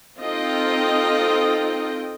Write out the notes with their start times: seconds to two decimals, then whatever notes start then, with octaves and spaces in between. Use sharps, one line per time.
0.18 C4 D#4 F4 A4 D#5 G5